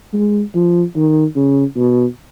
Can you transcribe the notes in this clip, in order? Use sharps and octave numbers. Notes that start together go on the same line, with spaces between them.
G#3
F3
D#3
C#3
B2